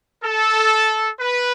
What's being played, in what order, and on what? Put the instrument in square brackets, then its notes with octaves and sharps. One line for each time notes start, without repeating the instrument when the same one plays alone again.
[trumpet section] A4
B4